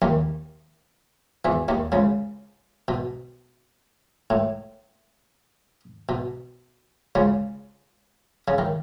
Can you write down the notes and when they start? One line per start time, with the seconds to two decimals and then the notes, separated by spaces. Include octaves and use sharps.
0.02 D#2 D#3
1.45 E2 E3
1.68 D#2 D#3
1.92 C#2 C#3
2.88 B2
4.30 A2
6.09 B2
7.15 C#2 C#3
8.48 C#3
8.58 D#3